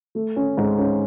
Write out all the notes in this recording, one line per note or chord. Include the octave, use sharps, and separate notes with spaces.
A3
C#4
G#2
C#4